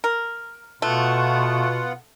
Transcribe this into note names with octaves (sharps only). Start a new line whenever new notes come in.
A#4
B2 A3 B3 F4 F#5